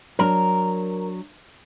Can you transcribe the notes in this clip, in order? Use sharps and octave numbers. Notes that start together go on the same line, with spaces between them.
F#3 D4 A#4